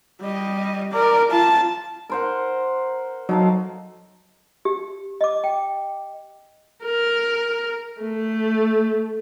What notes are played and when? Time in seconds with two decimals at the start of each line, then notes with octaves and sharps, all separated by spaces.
0.21 G3 D#5
0.91 A#4 D5
1.30 F4 A5
2.10 A#4 C5 F#5
3.29 F#3 D#4 A4 F5
4.65 G4
5.21 D#5 D6
5.44 G5
6.84 A#4
8.01 A3